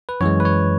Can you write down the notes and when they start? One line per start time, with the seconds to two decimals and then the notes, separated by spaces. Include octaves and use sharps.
0.09 B4
0.21 F#2 E3 G#3 C#5
0.40 B4
0.45 C#5